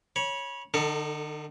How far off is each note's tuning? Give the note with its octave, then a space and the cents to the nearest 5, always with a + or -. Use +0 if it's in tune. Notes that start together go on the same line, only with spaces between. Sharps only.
C#5 +0 B5 -30
D3 +40 D#4 +0 A4 +10